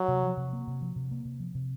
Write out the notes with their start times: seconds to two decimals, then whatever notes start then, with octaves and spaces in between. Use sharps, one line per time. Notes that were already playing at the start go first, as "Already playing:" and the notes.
Already playing: F#3
0.08 C3
0.23 F3
0.37 C3
0.53 A#3
0.67 C3
0.82 F3
0.96 C3
1.11 A#3
1.25 C3
1.40 F3
1.55 C3